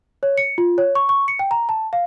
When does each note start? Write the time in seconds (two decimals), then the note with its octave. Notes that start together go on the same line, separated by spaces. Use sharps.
0.23 C#5
0.38 C#7
0.58 F4
0.78 C#5
0.95 C#6
1.09 C#6
1.28 C#7
1.39 G5
1.51 A#5
1.69 A5
1.93 F5